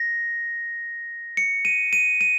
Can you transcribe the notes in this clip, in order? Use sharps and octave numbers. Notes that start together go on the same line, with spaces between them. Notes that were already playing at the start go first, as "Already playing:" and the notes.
Already playing: A#6
C#7
D#7
D#7
D#7